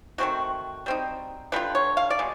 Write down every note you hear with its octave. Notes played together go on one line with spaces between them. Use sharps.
D#3 F#3 A3 C4 F#4
G3 C4 D#4
D3 G3 C4 F4 B4
C#5
F5
D5
B2 G#3